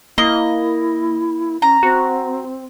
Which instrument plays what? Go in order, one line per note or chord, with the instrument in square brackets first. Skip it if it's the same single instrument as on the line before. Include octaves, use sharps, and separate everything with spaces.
[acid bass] A#3 [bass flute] E4 [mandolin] D#5
[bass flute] C#4 [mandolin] A#5
[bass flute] C4 [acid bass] F#4